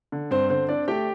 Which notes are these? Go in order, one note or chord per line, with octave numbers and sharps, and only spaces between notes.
D3
G2 C4 C5
D3 C4 C5
C4 D4 D5
A3 G4 G5